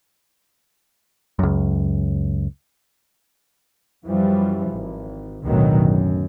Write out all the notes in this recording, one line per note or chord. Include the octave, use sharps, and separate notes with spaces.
C#2 F#2
F#2 E3 F3 G3
G#1
A1 D2 G#2 B2 D#3 F#3
F#2